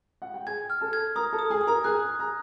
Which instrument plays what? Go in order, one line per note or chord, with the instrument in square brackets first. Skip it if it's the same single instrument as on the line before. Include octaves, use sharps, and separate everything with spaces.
[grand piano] F#5
G5
[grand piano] G#4 G#5 [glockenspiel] G#6
[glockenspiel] F6
[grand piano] A4 A5
[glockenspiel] G#6
[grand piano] A#4 A#5 [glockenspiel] D#6
[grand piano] A4 A5
[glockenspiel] D#6
[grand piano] G#4 G#5
[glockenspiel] D#6
[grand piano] A#4 A#5
[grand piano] G#4 G#5 [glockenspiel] F#6
[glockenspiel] D#6
[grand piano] A#5